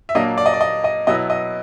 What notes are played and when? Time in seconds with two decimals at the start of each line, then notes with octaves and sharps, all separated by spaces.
0.09 E5
0.15 A#2 F#3 A#3 D4 D#5
0.38 D5
0.46 D#5
0.54 D5
0.61 D#5
0.84 D#5
1.07 B2 F#3 B3 E4 D#5
1.30 D#5